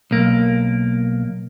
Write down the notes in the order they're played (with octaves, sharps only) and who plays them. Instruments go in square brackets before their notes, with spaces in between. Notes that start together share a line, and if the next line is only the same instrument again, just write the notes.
[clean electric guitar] B1 A#3